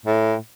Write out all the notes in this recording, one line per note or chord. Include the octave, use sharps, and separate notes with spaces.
A2